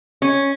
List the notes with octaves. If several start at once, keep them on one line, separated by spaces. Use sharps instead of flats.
C#4